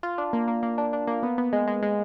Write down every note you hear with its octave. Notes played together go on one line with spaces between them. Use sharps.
F4
D4
A#3
A#3
A#3
D4
D4
A#3
B3
B3
G#3
G#3
G#3